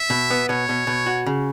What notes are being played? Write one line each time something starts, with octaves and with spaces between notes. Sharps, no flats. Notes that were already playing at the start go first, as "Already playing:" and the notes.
Already playing: E5
B2
B3
B2 C#5
B2
B2
F#4
C#3